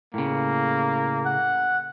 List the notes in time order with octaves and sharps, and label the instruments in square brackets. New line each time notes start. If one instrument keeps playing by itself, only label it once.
[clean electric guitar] A2 C#3 [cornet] A#3
[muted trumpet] F#5